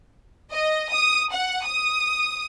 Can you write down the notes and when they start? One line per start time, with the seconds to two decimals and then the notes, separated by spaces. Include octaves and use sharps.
0.51 D#5
0.91 D#6
1.31 F#5
1.64 D#6